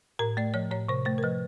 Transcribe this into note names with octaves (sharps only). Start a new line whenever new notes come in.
A2 A#4
A3 D5
F3 C#5
A2 C#5
C3 C5
A3 C5
A#4
F3 B4